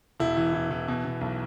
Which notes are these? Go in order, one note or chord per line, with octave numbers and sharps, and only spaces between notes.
E1 E4
E3
E3
E3
B2
B2
B1